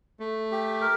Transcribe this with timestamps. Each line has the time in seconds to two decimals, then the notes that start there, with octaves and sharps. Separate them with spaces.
0.20 A3
0.51 G4
0.81 A#4